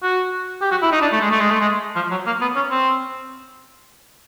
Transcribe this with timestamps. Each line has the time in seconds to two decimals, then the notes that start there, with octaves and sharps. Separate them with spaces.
0.02 F#4
0.62 G4
0.71 F#4
0.82 E4
0.92 D#4
1.02 D4
1.12 A3
1.21 G#3
1.31 A3
1.40 G#3
1.51 A3
1.61 G#3
1.95 F3
2.11 F#3
2.26 A#3
2.41 B3
2.55 C#4
2.71 C4